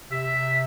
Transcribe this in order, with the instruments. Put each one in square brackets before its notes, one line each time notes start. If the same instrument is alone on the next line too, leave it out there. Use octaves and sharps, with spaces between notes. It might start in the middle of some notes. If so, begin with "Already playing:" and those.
[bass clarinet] C3 [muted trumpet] E5